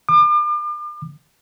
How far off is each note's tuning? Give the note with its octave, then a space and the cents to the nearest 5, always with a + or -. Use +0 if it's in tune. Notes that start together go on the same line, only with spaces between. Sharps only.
D6 +40